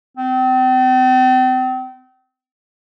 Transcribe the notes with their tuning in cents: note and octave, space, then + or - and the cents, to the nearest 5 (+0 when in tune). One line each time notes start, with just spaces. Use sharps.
C4 -35